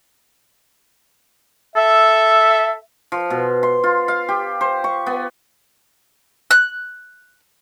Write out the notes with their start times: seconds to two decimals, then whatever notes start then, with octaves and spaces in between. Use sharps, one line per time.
1.76 A4 E5
3.12 F3
3.30 B2
3.63 C6
3.84 F4
4.08 F5
4.29 G4
4.61 C5
4.84 C#6
5.06 B3
6.51 F#6